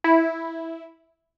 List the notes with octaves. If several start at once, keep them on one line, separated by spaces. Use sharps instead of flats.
E4